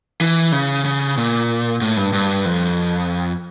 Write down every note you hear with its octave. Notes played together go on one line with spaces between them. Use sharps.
E3
C#3
C#3
A#2
A2
G2
G2
F2